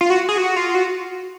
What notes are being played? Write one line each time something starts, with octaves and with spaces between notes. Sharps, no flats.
F4
F#4
G#4
F#4
F4
F#4